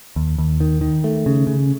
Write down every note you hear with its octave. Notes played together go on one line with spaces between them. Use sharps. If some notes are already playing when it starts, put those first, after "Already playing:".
D#2
D#2
D#3
D#3
A3
C#3
C#3